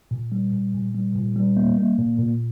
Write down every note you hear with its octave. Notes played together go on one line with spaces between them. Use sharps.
A#2
G3
A#2
A#2
G3
A#2
G3
A#3
A#3
A#2
A#2